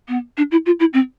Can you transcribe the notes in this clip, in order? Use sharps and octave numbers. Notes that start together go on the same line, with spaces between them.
B3
D4
E4
F4
E4
C4